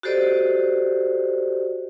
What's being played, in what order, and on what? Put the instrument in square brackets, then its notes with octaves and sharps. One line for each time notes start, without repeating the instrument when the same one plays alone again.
[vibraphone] F#4 G4 A4 C5 D5 D#5